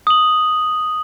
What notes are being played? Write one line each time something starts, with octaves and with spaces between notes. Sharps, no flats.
D#6 F#7